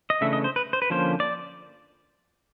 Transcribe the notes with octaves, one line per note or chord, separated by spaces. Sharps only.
D#5
C#3 E3 A3 D4 E5
D#5
C5
B4
C5
B4
D3 F3 A#3 C#4 C5
D5